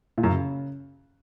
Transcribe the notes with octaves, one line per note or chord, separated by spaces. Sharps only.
A#2
F#2
C#3